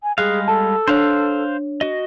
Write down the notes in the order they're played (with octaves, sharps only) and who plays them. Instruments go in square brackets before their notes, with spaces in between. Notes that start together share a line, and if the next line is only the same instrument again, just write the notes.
[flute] G#5
[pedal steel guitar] G3 G#3 F5 [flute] G#4 [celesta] F#6 C7
[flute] A4 [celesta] A5
[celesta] D4 C#5 [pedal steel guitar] C5 F5 F#6
[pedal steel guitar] F#4 D#5